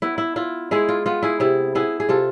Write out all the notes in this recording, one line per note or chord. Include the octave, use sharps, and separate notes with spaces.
B3 E4
E4
E4 F4
G#3 E4 G#4
F4
B3 F4
E4 G#4
C3 E4
B3 E4 G#4
G#4
C3 F4 A4